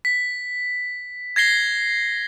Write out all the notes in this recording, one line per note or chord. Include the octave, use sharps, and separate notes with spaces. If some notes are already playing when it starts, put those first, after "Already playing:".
B6
G#6 A#6 C7 G7